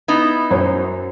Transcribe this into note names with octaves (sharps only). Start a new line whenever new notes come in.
B3 D#4 E4
F#2 C5 C#5